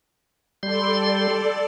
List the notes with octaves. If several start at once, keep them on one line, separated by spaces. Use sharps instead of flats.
G3 A4 D5 C6